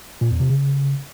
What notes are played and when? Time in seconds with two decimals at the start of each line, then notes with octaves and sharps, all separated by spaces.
0.21 A#2
0.31 E2
0.40 C3
0.49 C#3